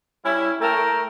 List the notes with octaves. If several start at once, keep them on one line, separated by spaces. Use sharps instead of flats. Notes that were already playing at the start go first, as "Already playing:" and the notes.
G3 C#4 E4
A3 A4 A#4 G5 A#5